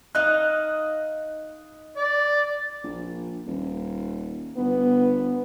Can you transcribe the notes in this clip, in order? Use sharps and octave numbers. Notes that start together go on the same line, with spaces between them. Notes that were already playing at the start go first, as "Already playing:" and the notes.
D#4 D#5 F5 F#6
D5
A#1
D#1
G1 B3